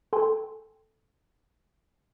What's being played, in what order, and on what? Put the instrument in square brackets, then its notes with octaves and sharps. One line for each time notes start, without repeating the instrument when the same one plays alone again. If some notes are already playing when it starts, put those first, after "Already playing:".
[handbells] A4 G5 G#5 C6